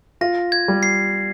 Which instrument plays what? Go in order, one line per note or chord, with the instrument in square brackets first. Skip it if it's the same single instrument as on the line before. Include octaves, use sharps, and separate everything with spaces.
[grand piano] F4 [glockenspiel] A#6
[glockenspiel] G#6
[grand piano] G3
[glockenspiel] C7